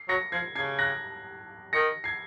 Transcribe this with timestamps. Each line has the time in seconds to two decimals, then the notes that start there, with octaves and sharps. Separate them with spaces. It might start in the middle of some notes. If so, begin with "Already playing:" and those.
Already playing: C7
0.08 F#3 A#6 C#7
0.32 F3 G#6 C7
0.55 C#3 G#6 C7
0.79 F#6 A#6
1.73 D#3 A#6 C#7
2.04 G#6 C7